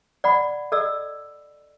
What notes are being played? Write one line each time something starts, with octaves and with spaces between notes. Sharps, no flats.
D5 F#5 B5
A4 D5 D#5 E6